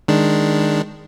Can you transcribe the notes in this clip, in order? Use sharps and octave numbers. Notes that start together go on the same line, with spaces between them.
D#3 G#3 D4